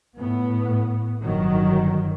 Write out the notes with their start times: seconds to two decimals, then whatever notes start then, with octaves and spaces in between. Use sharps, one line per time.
0.19 A2 B3
1.22 G1 D#3 F#3